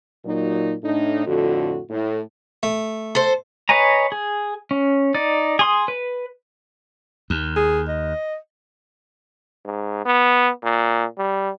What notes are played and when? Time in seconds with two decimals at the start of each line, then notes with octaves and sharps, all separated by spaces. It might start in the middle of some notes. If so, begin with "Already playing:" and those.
0.25 A#2 F#3 D#4
0.83 A2 D4 D#4
1.27 F2 A2 D3 F#4
1.90 A2
2.63 A3
3.15 A4 C5
3.69 B4 C#5 D#5 G#5 A#5
4.12 G#4
4.71 C#4
5.14 D#4 D5
5.59 G#4 C6 D#6
5.88 B4
7.30 D#2
7.56 G#4
7.88 D#5
9.65 G#2
10.05 B3
10.63 A#2
11.18 G3